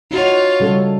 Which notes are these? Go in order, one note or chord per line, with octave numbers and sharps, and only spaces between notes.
D#4 F4 F#4 C#5
C#3 G3 A4